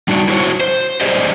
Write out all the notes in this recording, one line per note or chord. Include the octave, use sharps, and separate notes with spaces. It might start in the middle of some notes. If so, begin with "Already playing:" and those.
G3 D4 D#4 F#4
E4 F#4 C5 C#5
C5
G4 G#4 C5 D5 D#5